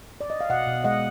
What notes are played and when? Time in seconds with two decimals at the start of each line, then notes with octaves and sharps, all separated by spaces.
0.21 D5
0.30 D#5
0.41 F5
0.49 B2 D#5 F#5
0.67 B2
0.84 G#3 D#5 F#5